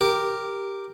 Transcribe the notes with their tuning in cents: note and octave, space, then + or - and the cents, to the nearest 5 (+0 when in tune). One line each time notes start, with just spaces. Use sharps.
G4 +0 A#4 -5